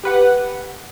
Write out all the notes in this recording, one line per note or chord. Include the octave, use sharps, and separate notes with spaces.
G4 B4 F#5